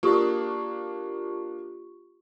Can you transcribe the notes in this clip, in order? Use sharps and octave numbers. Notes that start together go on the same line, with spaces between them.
A#3 D4 F4 G4 C#6